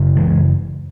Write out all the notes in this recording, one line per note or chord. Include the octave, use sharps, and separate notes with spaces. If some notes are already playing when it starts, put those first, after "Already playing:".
Already playing: F#2 C#3
E3 G#3